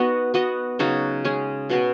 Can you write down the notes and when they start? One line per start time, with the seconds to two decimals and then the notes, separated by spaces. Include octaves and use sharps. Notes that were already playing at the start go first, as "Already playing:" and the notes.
Already playing: B3 D#4 F#4 B4 D#5
0.34 B3 F#4 B4 D#5
0.79 C#3 F#3 D#4 F#4
1.25 G#3 C#4 G#4
1.70 B2 B3 F#4 B4